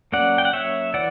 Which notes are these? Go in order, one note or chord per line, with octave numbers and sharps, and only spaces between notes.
F#3 A#3 C#4 D5 F#5
G5
F#5
C#5 E5
E3 D5 F#5